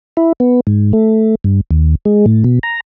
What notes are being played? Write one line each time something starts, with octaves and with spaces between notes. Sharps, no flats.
E4
B3
G#2
A3
G2
D#2
G#3
A2
B2
A#5